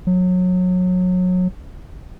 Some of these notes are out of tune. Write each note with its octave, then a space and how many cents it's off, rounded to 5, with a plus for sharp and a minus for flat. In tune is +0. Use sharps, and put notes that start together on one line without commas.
F#3 -25